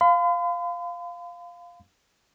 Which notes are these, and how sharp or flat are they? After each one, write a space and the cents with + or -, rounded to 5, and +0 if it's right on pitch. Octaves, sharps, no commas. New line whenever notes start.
F5 +0 B5 +45